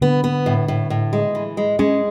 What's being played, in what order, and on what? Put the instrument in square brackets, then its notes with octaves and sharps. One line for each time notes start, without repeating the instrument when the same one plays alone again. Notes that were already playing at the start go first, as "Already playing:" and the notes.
[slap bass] D3 [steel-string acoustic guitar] B3
[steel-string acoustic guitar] B3
A2
A2
A2
G#3
E3
G#3
[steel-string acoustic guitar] G#3 [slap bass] C#4